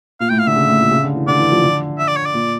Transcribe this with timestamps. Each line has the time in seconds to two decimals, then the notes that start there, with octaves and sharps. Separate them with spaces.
0.20 A#2 F5
0.29 A2 G5
0.39 F5
0.47 D3 E5
0.56 C#3
0.68 A2
0.81 A#2
0.91 C#3
1.04 D3
1.16 E3
1.27 D3 D5
1.39 E3
1.52 F3
1.64 D3
1.99 E5
2.08 D5
2.17 C#5
2.26 D5
2.34 A#2